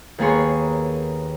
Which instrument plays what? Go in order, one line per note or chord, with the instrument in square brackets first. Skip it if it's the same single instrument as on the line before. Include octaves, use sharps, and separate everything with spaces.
[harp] D#2 A#3 B3 G#4 C#5 C6